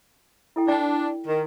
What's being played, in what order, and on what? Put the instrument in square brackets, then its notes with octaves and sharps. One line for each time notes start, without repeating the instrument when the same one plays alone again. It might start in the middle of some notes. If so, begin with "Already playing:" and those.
[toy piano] E4 A4 G5
[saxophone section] D4 [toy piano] D5 G5
[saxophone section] D#3